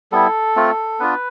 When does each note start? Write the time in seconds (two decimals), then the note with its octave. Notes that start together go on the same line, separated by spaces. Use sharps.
0.12 G3 B3 E4 A4
0.56 A3 C4 F4
1.00 B3 D4 F4 B4